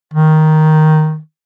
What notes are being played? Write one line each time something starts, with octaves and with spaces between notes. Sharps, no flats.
D#3